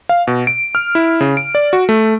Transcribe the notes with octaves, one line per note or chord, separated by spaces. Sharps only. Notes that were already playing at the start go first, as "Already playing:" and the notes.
F5
B2
D7
F6
E4
C#3
D7
D5
F#4
A3